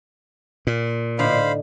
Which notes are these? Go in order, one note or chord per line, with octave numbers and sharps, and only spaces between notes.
A#2
A2 D3 D#4 C5 F5 B5